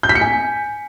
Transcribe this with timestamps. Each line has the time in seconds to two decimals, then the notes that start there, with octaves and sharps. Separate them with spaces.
0.03 G6
0.09 B6
0.15 C#7
0.21 G#5